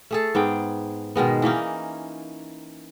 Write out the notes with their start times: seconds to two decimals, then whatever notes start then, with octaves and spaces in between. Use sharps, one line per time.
0.11 A3 G#4 A4
0.35 G#2 B3 G#4 G5
1.16 B2 D#3 G#3 B3
1.42 E3 A#3 C#4 D#4